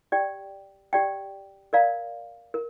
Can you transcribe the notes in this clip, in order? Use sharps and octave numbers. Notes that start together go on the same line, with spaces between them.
G4 D5 G5
G4 D5 G5
A#4 D5 F5 A#5
A#4